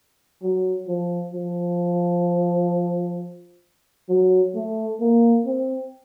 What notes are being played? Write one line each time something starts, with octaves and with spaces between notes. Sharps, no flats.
F#3
F3
F3
F#3
A3
A#3
C4